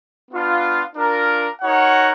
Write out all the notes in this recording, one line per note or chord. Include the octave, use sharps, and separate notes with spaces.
B3 D4 F4
D4 F4 A#4
D#4 F#4 A#4 C#5 F#5